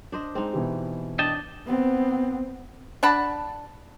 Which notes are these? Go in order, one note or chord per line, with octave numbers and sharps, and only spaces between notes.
D4 C5 D#5
G#3 C4 D#4
B2 E3 G4
D4 D#5 G5 A5
B3 C4
D4 F#5 A5 B5